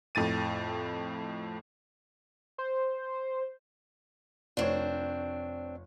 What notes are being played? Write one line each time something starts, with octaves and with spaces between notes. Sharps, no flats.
F2 A2 A6 D#7
C5
F1 C4 D4 C#5